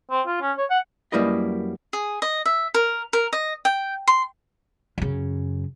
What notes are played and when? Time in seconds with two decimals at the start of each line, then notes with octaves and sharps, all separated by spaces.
0.10 C4
0.27 F4
0.41 C#4
0.58 C#5
0.70 F#5
1.12 F#2 G3 A#3 E4 B4 D#5
1.93 G#4
2.22 D#5
2.46 E5
2.74 A#4
3.13 A#4
3.33 D#5
3.65 G5
4.07 C6
4.98 F#2 C#3